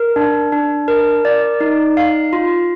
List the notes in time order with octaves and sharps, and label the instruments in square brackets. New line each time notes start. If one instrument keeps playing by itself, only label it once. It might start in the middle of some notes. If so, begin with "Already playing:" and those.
Already playing: [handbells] A#4
D4
D4
A#4
D5
D#4
F5
F4